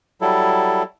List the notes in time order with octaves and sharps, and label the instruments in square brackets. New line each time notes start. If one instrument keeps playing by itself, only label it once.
[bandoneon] F#3 G3 E4 A4